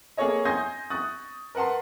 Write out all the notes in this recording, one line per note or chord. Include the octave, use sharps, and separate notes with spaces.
A#3 G#4 A4 C#5 D#5
G#5 C6 D#6 G6 G#6 A#6
C#6 D#6 F#6 A6
A#4 B4 F#5 A5 C6